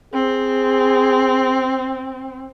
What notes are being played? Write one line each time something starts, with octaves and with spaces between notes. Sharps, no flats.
C4 G#4